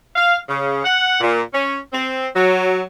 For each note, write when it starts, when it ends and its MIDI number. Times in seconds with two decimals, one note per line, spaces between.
0.16 0.37 77
0.49 0.81 49
0.84 1.18 78
1.21 1.41 46
1.54 1.78 61
1.93 2.27 60
2.36 2.81 54